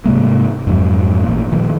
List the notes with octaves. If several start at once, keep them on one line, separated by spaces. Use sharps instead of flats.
G#2 C3 G#3 A#3
F2 G#2 F#3
A1 A#2
A#2 D#3 F3